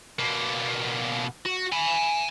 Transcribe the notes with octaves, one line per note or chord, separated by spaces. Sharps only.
B2 A#3
F#4
G#5 B5